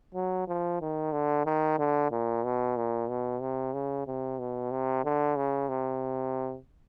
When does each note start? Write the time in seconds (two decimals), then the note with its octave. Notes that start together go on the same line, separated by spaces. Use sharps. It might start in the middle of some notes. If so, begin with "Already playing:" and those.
0.15 F#3
0.48 F3
0.81 D#3
1.13 D3
1.46 D#3
1.79 D3
2.12 A#2
2.44 B2
2.77 A#2
3.09 B2
3.41 C3
3.74 C#3
4.07 C3
4.39 B2
4.71 C3
5.05 D3
5.36 C#3
5.69 C3